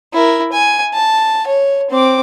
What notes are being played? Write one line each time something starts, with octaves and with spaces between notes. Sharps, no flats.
E4 A#4
G#5
A5
C#5
C4 D6